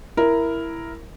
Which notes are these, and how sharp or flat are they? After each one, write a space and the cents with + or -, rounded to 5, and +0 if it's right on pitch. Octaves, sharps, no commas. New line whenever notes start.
E4 +5 A#4 +0